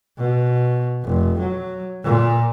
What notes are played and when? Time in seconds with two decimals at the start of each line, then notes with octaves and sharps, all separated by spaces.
0.18 B2
1.04 F1
1.39 F#3
2.04 A#2